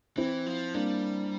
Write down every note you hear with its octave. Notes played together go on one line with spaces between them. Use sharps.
E3 C4 E4
F3
G3 A#3 D4